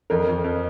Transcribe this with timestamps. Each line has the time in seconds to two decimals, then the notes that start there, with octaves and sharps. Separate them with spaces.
0.10 F2 A#4
0.28 F2
0.44 F2